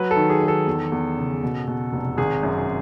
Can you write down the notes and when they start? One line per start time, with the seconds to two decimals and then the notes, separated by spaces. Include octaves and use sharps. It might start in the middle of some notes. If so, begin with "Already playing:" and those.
Already playing: F#3 B4
0.11 A4
0.16 D#3
0.30 G#4
0.41 D#3
0.48 A4
0.67 E2
0.92 E2
1.17 C#3
1.43 B2
1.67 B2
1.93 F1
2.18 G#1 G#4
2.43 F#2